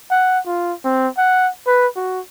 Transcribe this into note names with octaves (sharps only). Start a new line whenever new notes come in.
F#5
F4
C4
F#5
B4
F#4